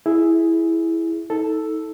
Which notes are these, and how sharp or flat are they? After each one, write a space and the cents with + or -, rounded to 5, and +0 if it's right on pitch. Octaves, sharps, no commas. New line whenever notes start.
E4 +0 G#4 +0
D#4 +40 A4 +0